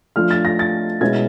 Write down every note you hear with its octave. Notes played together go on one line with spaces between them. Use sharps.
F3 A3 D4 F4 F6
A6
A#6
A6
B2 G#3 C#4 E4 G#6